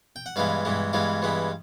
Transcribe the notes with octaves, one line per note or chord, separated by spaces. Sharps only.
G5
F#5
G2 E3 G#3 B3 F5
G2 E3 G#3 B3
G2 E3 G#3 B3 F5
G2 E3 G#3 B3